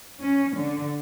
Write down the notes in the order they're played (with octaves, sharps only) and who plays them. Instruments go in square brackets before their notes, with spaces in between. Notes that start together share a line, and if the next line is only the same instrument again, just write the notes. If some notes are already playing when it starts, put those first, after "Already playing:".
[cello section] C#4
D3